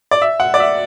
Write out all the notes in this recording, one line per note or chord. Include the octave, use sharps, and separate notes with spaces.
D5
E5
F#5
D5
E5